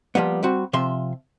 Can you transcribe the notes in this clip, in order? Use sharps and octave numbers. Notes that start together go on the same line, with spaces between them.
F3 G3 A#3 B3
G3 C4 F#4
C3 F3 E5 C6